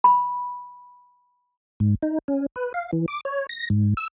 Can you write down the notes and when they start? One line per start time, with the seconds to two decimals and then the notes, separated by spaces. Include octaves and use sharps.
0.04 B5
1.80 G#2
2.03 D#4
2.28 C#4
2.56 B4
2.74 F5
2.93 E3
3.08 D6
3.25 C#5
3.49 A#6
3.70 G#2
3.97 E6